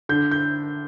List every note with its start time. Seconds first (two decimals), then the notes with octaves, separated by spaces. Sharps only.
0.09 D3 G6
0.31 G6